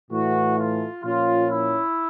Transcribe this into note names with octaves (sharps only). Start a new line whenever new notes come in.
A2 E3 A3 F#4
F4
A#2 F3 A#3 C#4 F4
E4